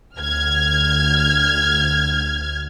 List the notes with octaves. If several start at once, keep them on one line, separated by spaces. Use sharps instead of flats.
D2 F6 G#6